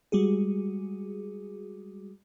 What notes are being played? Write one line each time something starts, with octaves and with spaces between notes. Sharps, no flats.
G3 G#3 F#4 G#4